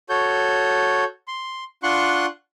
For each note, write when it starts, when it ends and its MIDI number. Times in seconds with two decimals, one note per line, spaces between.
0.09 1.04 66
0.09 1.04 69
0.09 1.04 73
0.09 1.04 91
1.28 1.64 84
1.83 2.26 62
1.83 2.26 65
1.83 2.26 78
1.83 2.26 84
1.83 2.26 85
1.83 2.26 90